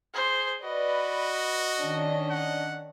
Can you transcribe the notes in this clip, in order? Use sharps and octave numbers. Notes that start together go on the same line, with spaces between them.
G#4 C5
F#4 B4 D5 D#5
D#3 C#4 D4
F#5